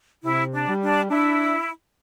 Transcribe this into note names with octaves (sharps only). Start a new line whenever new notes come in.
C3 E4
D4
G3
D4
D4 E4